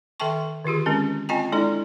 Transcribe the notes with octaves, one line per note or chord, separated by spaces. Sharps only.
D#3 A4 E5 G5 A5 C#6
D3 D#3 F4 G4 G#4
G#3 C4 C#4 A#4
C4 F4 D#5 G5 G#5 A#5
G#3 D4 E4 A4 D5